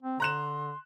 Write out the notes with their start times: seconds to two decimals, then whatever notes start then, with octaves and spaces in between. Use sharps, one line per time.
0.02 C4
0.20 D3 A#5 C6 F#6 E7